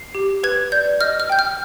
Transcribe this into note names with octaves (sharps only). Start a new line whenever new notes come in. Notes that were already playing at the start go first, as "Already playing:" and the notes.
Already playing: C7
G4
B4 G#6
D5 G6
D#5 F6
F6
G5 G6
F6